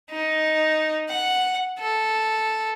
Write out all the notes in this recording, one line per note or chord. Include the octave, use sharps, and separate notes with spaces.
D#4
F#5
A4